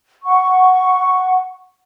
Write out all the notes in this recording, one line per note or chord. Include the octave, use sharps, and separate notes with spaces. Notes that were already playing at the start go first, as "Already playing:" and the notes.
F#5 C#6